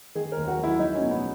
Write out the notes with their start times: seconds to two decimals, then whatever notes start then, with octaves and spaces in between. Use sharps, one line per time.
0.15 D#3 G#4
0.32 D#2 A#4
0.48 F#4
0.58 F#3
0.63 E4
0.79 F#3 D#4
0.95 C#4
1.01 B2
1.11 B3